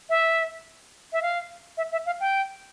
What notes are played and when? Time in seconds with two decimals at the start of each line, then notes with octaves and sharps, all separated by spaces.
0.10 E5
1.13 E5
1.22 F5
1.77 E5
1.92 E5
2.06 F5
2.20 G5